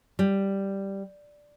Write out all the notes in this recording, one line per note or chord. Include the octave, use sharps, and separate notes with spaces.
G3